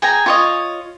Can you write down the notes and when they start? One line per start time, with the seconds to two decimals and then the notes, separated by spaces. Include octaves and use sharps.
0.02 G#4 G5 G#5 A#5
0.26 F4 C#5 D#5